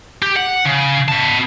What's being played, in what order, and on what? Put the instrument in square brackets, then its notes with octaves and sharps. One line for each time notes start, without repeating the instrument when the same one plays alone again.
[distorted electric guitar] G4
F#5
C#3
B3 A5